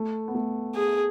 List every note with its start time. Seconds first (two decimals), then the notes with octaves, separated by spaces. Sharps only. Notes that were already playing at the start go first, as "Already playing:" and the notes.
Already playing: A3
0.28 B3
0.35 A3
0.76 G#4